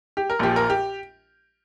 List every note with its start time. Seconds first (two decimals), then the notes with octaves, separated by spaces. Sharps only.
0.17 G4
0.30 A#4
0.39 A#1 A#2 F3 G4
0.56 A#4
0.70 G4